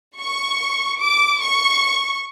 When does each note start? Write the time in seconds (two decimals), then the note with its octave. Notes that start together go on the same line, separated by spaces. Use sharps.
0.19 C#6
1.00 D6
1.41 C#6